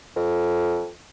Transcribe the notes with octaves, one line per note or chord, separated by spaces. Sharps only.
F2